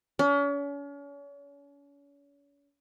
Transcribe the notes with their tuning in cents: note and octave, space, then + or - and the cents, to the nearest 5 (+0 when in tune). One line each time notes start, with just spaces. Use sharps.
C#4 +40